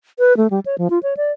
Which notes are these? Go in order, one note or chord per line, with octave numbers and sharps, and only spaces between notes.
B4
A3
G3
C#5
F3
F4
C#5
D5